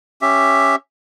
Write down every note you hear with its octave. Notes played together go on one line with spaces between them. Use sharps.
C#4 G4 E5